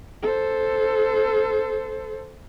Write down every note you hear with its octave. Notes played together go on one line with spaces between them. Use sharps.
A4 C5